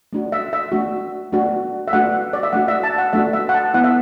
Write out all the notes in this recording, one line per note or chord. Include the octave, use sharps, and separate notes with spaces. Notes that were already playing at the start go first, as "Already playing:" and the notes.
A3 D4 F#4
E5
E5
A3 D4 F#4
A3 D4 F#4
E5
A3 D4 F#4 F#5
D5
E5
A3 D4 F#4 F#5
E5
A5
F#5
A3 D4 F#4 E5
E5
F#5
A5
B3 E4 F#5
E5